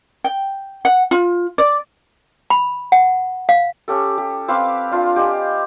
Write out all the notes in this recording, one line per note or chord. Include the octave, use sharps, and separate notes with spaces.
G5
F#5
F4
D5
B5
F#5
F5
C#4 G4 A4
G4
C4 B4 F5 D6
D4 F4 F5
G4 D#5 G#5